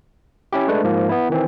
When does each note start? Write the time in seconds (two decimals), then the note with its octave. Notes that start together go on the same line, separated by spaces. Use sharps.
0.53 C#4 E4 G4
0.68 G#3 A3 D4 B4
0.84 G#2 F3 A#3
1.09 B3 E4
1.30 D#3 E3 C4